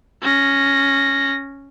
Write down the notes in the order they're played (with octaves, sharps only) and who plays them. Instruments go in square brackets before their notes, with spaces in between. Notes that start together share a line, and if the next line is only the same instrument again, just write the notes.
[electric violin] C#4 A#6